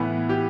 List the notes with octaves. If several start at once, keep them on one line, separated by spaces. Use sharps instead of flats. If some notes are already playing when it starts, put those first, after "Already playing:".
Already playing: A2 E3 B3
G4